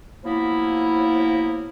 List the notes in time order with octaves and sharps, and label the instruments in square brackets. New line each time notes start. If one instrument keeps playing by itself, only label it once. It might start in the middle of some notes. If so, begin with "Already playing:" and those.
[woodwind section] F3 F#3 A#3 B3 E4